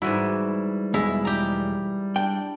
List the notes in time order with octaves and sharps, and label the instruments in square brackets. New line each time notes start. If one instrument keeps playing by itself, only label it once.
[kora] G#2 E3 F#4 [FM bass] G3 [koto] E4
[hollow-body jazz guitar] B1 E2 G#3 [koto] E4
[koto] G4 A#5
[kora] D4 [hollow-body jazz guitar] G5